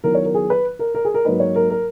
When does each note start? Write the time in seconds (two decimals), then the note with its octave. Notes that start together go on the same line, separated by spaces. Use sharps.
0.04 D#3 F#3 B3 E4 A#4
0.15 C#5
0.25 A#4
0.34 G#4
0.50 B4
0.79 A#4
0.95 A#4
1.05 G#4
1.14 A#4
1.25 G#2 F#3 A#3 D#4 B4
1.40 C#5
1.56 A#4
1.70 A#4